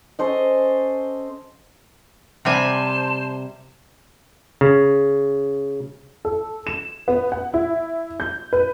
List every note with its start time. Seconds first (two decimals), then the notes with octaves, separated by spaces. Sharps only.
0.19 C#4 A4 C5 D#5
2.45 C3 G3 C5 G#5 A5 C6
4.61 C#3
6.25 A4
6.67 E7
7.08 B3
7.32 F#5
7.54 E4
8.20 G6
8.53 B4